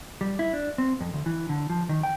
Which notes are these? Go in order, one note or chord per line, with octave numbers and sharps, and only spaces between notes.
G3
E4
D4
C4
F2
D2
E3
D3
F3
D#3
G5